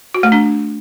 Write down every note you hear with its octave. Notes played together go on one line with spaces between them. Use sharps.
F#4
A3
D4